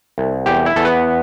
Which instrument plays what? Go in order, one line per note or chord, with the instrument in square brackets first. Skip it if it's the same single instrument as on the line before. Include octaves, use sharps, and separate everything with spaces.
[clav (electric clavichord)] C2
E2 G4 G5
E4 E5
E2 A4
B3 B4